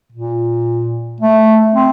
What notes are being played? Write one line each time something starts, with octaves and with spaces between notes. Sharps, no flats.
A#2
A3
C4